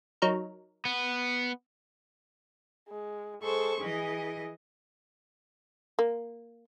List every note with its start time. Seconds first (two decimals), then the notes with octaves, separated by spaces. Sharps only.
0.22 F#3 D#4 A#4
0.85 B3
2.89 G#3
3.42 G#3 A4 C5 C#6
3.81 E3 G#4 D#5
5.99 A#3